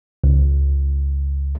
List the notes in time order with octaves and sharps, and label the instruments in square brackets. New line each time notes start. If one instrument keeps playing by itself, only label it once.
[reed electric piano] C#2